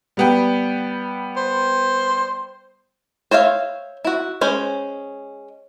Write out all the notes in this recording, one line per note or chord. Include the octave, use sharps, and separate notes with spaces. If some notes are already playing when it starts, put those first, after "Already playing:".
G3 B3 G5
C5
C5 C#5 E5 F5
E4 F#4
G#3 C#4 C5